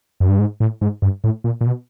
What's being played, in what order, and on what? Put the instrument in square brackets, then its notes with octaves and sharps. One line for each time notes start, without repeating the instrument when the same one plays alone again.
[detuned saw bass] F#2
G2
G#2
A2
G#2
G2
A2
A#2
A#2
B2